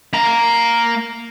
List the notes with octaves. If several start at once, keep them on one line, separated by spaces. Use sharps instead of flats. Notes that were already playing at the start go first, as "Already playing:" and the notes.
A#3 A#5